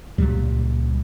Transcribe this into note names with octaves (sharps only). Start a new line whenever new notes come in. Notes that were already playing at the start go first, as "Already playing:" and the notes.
C#2 A#2 F#3 G3